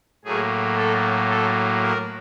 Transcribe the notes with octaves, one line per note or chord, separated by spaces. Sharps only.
A2 F#3 A#3 G#4
A4
A4
A#4